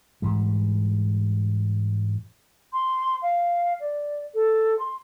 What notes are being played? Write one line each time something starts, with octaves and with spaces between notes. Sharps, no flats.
G#2 E3 G3
C6
F5
D5
A4
C6